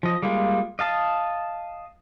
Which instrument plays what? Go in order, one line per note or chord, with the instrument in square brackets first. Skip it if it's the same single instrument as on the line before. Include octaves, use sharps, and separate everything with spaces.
[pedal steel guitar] F3 D#5
G3 G#3 A#3 F4
D#5 F5 A5